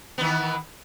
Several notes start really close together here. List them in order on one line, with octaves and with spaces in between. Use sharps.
B3 D#3 E3